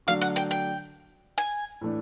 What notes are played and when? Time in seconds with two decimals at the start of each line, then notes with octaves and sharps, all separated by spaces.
0.07 D3 F#3 A3 D4 F#4 F5
0.21 F#5
0.36 G5
0.51 G5
1.38 G#5
1.81 A2 E3 A3 D4